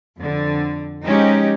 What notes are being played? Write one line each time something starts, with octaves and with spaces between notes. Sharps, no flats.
F2 D3
F3 G#3 C#4 D#4 G4